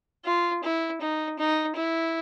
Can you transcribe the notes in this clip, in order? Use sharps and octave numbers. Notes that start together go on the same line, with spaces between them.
F4
E4
D#4
D#4
E4